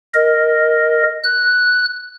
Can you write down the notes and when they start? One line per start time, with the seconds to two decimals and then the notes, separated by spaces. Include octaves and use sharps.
0.14 A#4 D#5
1.24 F#6